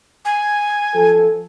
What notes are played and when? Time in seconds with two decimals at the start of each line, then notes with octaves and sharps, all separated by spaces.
0.25 G#5
0.94 F3 A4